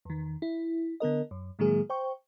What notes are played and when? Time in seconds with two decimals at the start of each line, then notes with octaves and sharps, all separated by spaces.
0.05 E2 D#3
0.42 E4
1.00 D3 B3 A#4 D#5
1.31 F#2
1.59 A2 D#3 F#3 G#3 A#3 G#4
1.90 C5 G5 C#6